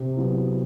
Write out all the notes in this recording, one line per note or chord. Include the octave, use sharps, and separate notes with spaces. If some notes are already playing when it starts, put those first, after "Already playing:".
Already playing: C3
F#3 B3 E4